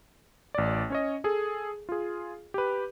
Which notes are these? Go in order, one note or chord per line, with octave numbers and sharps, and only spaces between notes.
A1 D5
C#4 C#5 D#5
G#4 A4
F4 G#4
G4 B4